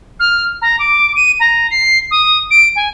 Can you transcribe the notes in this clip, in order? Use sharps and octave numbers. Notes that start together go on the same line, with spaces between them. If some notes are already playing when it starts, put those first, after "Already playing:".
F6
A#5
D6
D#7
A#5
C7
D#6
D7
G#5